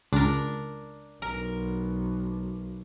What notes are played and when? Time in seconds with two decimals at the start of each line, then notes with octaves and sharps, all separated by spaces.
0.13 C#2 D4 A#4
1.22 B1 A#4